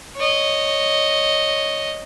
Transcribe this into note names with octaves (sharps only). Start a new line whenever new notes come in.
C#5 D#5